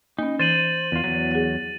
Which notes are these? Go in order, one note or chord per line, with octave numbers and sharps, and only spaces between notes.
A#3 C#4 D#4
E3 C5 A6 D#7 F#7
E2 F4
E2 F#3
G#4 F#5